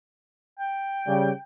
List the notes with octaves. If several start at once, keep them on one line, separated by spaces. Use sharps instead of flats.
G5
C#3 G3